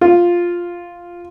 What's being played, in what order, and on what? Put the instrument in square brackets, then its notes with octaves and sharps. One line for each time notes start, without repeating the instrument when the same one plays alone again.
[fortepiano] F4